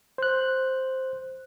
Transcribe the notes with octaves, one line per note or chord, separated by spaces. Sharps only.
C5 F#6